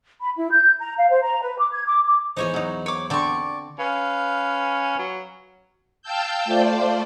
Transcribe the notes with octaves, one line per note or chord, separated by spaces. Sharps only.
B5
E4
G6
A#5
F5
C5
A#5
B4
D6
G#6
D6
D6
E2 D#4 C5 C#5 G#5
F#3 D#4
C#5 D6
D3 C4 D5 C#6
C#4 B4 F5
F#3
F5 G5 A5 E6 G6
A3 F4 C5 D5